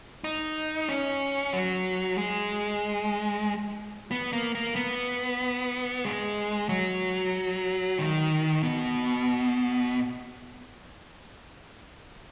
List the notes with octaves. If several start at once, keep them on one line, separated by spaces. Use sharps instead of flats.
D#4
C#4
F#3
G#3
B3
A#3
A#3
B3
G#3
F#3
D#3
B2